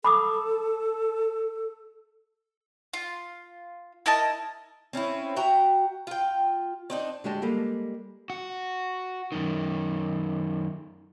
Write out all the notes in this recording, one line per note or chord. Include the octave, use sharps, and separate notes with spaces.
A4 B5 D6 D#6
F4
E4 A#4 D#5 A5
C4 C#4 D#4 E4
F#4 E5 G5 A#5
F4 G5
C4 D4 D#4
D3 G#3 F#4 G4 D5 A5
G3 G#3 A#3 G4 A4
F#4
F#2 D#3